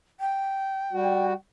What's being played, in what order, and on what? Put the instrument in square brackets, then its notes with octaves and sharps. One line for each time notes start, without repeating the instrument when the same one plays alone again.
[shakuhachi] G5
[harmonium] G3 F#4